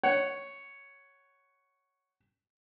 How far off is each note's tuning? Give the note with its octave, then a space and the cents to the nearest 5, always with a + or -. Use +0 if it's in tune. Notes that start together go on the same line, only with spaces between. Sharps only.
C#5 +0 F#5 +15